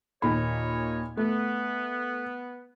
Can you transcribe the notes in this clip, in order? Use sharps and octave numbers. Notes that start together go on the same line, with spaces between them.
D#2 A#2 D#4 A#4 C#5 B5
A3 B3